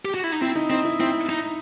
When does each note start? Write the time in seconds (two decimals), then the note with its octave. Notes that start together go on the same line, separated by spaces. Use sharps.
0.05 G4
0.14 F#4
0.24 E4
0.32 D#4
0.41 C4 E4
0.55 D#4
0.70 C4 D#4
0.85 E4
1.00 C4 E4
1.29 D#4